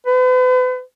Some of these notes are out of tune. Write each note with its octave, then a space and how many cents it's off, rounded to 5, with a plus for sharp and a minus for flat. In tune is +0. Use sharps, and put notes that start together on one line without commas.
B4 +40